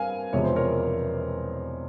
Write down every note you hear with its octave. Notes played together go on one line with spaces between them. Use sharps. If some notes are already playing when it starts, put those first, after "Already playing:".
Already playing: G2 C4 A#4 F5 G#5
E1 E2 C3 F3 G#3 C#5
C5
A#4 C#5